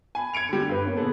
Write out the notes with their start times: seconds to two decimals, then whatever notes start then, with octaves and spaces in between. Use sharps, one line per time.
0.15 G#5 B5
0.33 G#6 C#7 D7 F7
0.49 D3 G3
0.69 G2 B4
0.85 A#3 C#4
0.96 A#2 D3 B3 G#4 A4